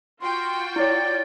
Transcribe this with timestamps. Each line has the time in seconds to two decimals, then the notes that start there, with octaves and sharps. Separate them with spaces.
0.21 F4 F#4 G5 C6
0.76 E4 C#5 D5